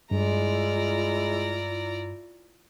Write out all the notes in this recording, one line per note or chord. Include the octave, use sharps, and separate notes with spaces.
G2 G#3 E4 F4 D5 A#5